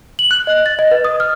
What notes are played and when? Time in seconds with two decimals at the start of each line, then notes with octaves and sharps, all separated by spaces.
0.19 F#7
0.31 F#6
0.47 D#5
0.66 A6
0.79 D#5
0.91 B4
1.05 D#6
1.20 F6